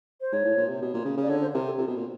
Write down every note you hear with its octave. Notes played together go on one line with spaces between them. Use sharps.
C5
G#2 C#5
A2
A#2
C3
B2
A#2
C#3
C#3
D5
D3 C#5
C5
C3 A#4
A4
C3 F4
B2
A#2